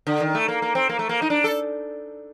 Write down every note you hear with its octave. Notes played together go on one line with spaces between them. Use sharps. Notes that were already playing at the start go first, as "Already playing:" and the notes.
D3
D#3
A3
A#3
A#3
C4
A#3
A3
A#3
D#4
D4
A4